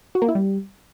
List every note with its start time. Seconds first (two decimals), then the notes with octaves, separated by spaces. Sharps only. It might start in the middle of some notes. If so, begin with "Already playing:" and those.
0.15 F#4
0.22 A#3
0.28 E4
0.35 G3